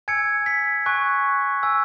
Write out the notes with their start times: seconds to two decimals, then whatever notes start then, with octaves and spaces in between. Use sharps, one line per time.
0.08 G#5 E6 G#6 C#7
0.46 B6
0.86 G#5 C#6 F#6
1.63 G#5 E6